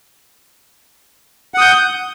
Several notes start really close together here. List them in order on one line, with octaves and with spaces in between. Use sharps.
F#5 D#6 G6